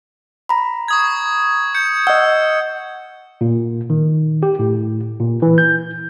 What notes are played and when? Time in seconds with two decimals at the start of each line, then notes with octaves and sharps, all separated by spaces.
0.49 A#5 B5
0.88 C#6 D#6 G#6
1.75 G6 C#7
2.07 D#5 F#5 E6
3.41 A#2
3.90 D#3
4.43 G4
4.59 A2
5.19 A#2
5.42 E3
5.58 G6